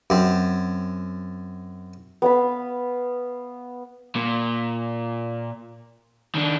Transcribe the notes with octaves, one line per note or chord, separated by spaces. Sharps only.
F#2 C4
B3 F5 B5
A#2
D#3 D4